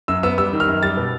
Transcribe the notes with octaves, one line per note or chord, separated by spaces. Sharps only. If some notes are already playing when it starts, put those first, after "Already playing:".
F#2 E6
B3 E6
G3 E6
D#3
F6
F#2
G3 A6
B2